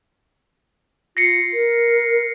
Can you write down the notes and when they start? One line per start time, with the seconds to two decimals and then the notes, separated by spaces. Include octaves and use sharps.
1.17 F4 A#6 C7 C#7
1.53 A#4